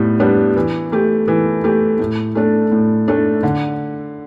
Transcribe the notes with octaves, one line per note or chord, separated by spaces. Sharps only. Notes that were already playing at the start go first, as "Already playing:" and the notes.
Already playing: A2 G3 B3
G3 B3 D4
E3
A3 G4
E3
A3 G4
A2
A3 D4 A4
A2
A3 D4 A4
D3